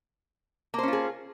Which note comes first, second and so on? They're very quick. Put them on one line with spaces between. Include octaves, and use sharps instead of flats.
A#3 C5 C#4 F4 G#4